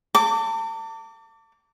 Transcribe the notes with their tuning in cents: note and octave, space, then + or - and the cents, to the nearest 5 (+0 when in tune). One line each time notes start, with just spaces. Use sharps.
A5 +40 D6 -20